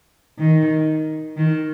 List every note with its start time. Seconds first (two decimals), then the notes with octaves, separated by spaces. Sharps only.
0.39 D#3
1.37 D#3